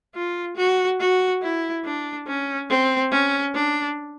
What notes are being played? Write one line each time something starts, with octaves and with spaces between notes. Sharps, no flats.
F4
F#4
F#4
E4
D4
C#4
C4
C#4
D4